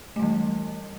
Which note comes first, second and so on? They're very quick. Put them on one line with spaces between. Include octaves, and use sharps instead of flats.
A3 G3 E3